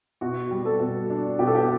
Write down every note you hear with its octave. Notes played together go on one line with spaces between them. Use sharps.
B2 F#4
G3
A4
B2
D4
B2 G4
A4
G4